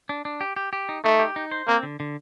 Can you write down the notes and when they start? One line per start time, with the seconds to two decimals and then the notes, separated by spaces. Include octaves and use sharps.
0.09 D4
0.25 D4
0.41 G4
0.56 G4
0.73 G4
0.89 D#4
1.04 A3 D#4
1.19 G4
1.36 D#4
1.51 C5
1.68 A#3 C4
1.83 D3
2.00 D3